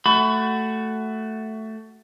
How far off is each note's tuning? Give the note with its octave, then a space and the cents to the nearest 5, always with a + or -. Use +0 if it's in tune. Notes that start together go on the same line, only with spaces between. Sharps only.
A3 +0 F#4 +15 B5 +25